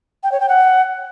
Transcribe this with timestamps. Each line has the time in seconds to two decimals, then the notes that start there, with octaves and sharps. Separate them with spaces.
0.23 G5
0.31 C#5
0.40 G5
0.48 F#5